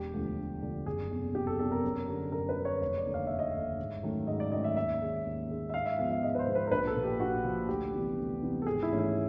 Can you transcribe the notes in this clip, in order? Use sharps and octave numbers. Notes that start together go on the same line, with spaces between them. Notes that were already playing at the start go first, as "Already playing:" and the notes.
Already playing: E1 G4
D2 D3 F3 A3
E1
D2 D3 F3 A3
F#1 G#4
E2 C3
F#1 G4
A4
E2 C3 A4
A#4
F#2
D3 G3
F#2 A#4
B4
D3 G3
C#5
F1 C#5
D5
D#2 D3
F5
F1 E5
D#5
D#2 D3 E5
G#2
D#3 F#3 A3 C#4
G#2 D#5
D5
D#3 F#3 A3 C#4 D#5
E5
D#2 E5
D#3 G#3 C#4
D#2
D#3 G#3 C#4
E5
G#2 F5
E5
F3 G#3 B3 F5
E5
G#2 D#5
B4
C5
F3 G#3 B3
B4
A#4
A#1 B4
A4
A#2 F3
G4
A#1 F#4
A#2 F3
D2 G4
C3 E3 G3 B3
D2
C3 E3 G3 B3
A4
G#1 G#4
E4
G#2 E3 A3 C#4
E4